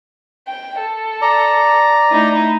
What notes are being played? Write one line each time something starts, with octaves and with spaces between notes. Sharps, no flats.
G5
A4
D5 A#5
A3 D#4 E4